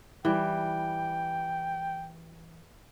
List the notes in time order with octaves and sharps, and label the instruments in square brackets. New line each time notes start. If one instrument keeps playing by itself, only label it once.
[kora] E3 G3 [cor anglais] G5